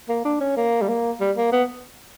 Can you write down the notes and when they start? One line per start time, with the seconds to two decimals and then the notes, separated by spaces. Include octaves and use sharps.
0.09 A#3
0.25 D4
0.40 C#4
0.57 A#3
0.82 G3
0.89 A#3
1.20 G3
1.37 A#3
1.52 B3